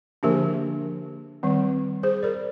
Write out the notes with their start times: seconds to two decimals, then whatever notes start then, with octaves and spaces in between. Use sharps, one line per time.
0.23 D3 F3 A#3 D4 G4 A#4
1.43 D#3 G3 C4
2.03 G#4 C5
2.23 A#4 D5